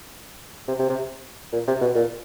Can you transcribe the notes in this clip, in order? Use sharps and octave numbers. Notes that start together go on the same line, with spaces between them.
C3
C3
C3
A#2
C3
B2
A#2